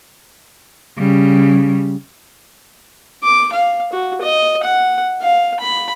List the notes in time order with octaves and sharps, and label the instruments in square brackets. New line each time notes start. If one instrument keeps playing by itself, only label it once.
[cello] C#3 G3
[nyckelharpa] D6
F5
F#4
D#5
F#5
F5
B5